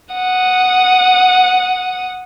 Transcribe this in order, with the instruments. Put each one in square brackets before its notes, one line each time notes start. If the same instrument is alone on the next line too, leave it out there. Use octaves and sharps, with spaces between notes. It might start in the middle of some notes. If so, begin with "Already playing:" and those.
[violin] F#5 D#6